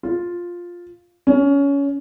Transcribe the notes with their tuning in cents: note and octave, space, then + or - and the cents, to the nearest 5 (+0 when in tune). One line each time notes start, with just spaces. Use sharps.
F4 +5
C#4 +20